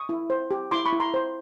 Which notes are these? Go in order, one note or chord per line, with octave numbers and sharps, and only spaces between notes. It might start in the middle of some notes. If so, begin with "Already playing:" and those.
Already playing: C#6 D#6
E4
C5
G4
E4 C6 D6
B5 C#6
E4
A#5 C6
C5